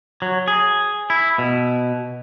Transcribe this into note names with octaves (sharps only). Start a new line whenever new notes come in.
F#3
G#4
E4
B2